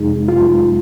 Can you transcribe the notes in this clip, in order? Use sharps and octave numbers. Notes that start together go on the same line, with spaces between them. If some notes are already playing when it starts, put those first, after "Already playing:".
Already playing: F2 C3 G#3 D#4 G#4
F4